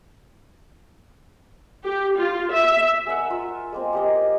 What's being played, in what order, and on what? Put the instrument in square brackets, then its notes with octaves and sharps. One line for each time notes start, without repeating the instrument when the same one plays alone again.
[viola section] G4
F4
E5
[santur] G#4 A#4 E5 F#5
F4
G#3 A#3 C4
A#3 G4 D#5